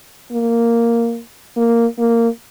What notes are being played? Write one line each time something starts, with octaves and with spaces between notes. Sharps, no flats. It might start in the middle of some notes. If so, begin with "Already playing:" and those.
A#3
A#3
A#3